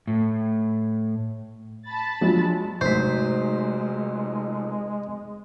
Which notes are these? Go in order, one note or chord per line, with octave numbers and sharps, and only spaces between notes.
A2
A5 B5 A6
F3 F#3 G#3 D4 F4
G#2 C3 F#3 G#3 A3 C5 B6